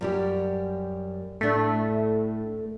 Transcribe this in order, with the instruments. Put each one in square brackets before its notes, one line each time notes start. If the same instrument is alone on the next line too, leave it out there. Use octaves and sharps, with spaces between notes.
[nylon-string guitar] F#2 G3 G4
[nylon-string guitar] A2 D4 [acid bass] A3